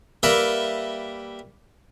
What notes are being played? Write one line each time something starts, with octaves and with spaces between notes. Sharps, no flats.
G3 A#3 A#4 B4 E5